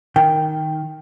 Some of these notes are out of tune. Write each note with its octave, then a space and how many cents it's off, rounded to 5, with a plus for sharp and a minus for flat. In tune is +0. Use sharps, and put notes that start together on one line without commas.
D#3 +0 G5 +0